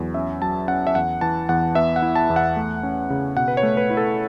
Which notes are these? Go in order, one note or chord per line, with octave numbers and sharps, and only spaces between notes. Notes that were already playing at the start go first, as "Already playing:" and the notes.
Already playing: E2 F#3
C#4 E5
F#3 A5
C#4 F#5
E5
E2 F#5
E3 A5
E2 F#5
B3 E5
F#5
E4
A5
E2
F#5
A3
C#4
C#3
B2 F#5
B4
C#5
A3
B4
E4
A4